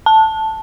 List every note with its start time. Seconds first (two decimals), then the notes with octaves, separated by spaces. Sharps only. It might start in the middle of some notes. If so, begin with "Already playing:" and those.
0.06 A5